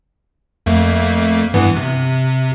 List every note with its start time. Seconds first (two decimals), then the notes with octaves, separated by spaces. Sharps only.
0.66 F2 A3 A#3
1.54 G2 E3 B3
1.77 C3